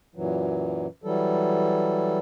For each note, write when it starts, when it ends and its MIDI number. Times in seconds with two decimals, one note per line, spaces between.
0.15 0.87 42
0.15 0.87 46
0.15 0.87 52
0.15 0.87 54
1.04 2.19 52
1.04 2.19 54
1.04 2.19 55
1.04 2.19 69